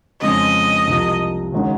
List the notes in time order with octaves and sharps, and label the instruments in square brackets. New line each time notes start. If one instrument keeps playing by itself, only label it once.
[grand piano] F2 C#3 G#3 C4 [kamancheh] D#5
[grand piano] C2 C3 F3
D#2 C#3 G#3 D#4 F#4